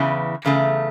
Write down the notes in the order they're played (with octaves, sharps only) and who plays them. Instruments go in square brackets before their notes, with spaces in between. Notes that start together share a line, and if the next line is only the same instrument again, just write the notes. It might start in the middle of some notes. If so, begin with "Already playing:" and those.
Already playing: [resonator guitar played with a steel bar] E2 C#3 E3
E2 C#3 A3